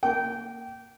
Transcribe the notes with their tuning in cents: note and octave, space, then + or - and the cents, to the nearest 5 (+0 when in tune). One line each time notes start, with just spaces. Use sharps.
A#3 -5 G5 -20